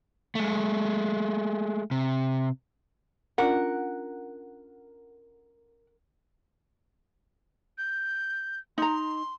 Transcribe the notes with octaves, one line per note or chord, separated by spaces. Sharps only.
G#3 A3
C3
C#4 D4 F4 A#4 F#5
G6
D#4 A#5 C6